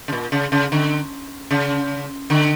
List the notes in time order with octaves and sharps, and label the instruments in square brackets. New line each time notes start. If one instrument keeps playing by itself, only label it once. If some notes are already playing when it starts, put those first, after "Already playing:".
[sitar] C#3
A#2
C#3
C#3
D3
C#3
D3